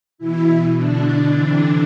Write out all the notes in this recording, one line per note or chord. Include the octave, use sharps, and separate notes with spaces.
B2 E3 E4
D3 D4
C3 E3